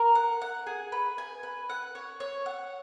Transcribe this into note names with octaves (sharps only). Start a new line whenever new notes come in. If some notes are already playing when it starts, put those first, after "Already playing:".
Already playing: A#4
F#5
F#5
G#4
B4
G#5
B4
F#5
C#5
C#5
F#5